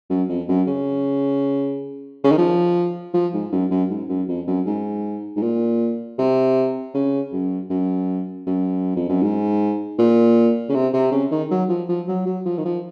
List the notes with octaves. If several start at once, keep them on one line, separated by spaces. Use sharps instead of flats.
F#2
F2
F#2
C#3
C#3
D#3
F3
F3
G#2
F#2
F#2
G#2
F#2
F2
F#2
G#2
G#2
A#2
C3
C#3
F#2
F#2
F#2
F2
F#2
G#2
A#2
C#3
C3
C3
C#3
D#3
F#3
F3
F3
F#3
F#3
F3
D#3
F3